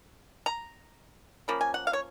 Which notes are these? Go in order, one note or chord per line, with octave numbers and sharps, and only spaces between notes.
A#5
F3 A#3 C#4 B5
G#5
F#5
F5
C#5